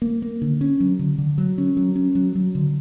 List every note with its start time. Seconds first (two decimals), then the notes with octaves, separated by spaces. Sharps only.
0.02 A#3
0.22 A#3
0.42 D3
0.61 C#4
0.80 F#3
0.99 D3
1.18 D3
1.38 F#3
1.58 C#4
1.77 F#3
1.96 C#4
2.15 F#3
2.35 F#3
2.55 D3